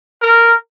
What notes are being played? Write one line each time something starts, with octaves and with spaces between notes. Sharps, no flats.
A#4